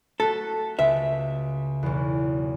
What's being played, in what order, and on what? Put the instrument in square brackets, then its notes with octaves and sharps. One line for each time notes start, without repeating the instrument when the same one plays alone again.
[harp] A3 F#4 B6 [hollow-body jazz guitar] A4
[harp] C#2 [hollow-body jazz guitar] E5
[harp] B1 E2